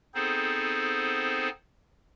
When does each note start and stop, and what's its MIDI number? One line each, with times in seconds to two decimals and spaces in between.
0.14 1.49 59
0.14 1.49 60
0.14 1.49 63
0.14 1.49 68
0.14 1.49 69
0.14 1.49 72